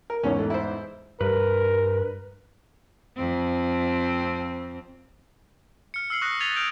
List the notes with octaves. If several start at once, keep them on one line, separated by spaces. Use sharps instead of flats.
A#4
E2 G#2 C#4 C#5
A3
E4 C5
G2 A#4 B4
F2 C4
F6 C#7
E6 F6 C7 F#7
C#6 D#6 F#6 A#6
G#6 A6 B6 D#7 F7 G7
F6 G6 D7